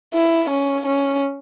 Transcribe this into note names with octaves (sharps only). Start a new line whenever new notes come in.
E4
C#4
C#4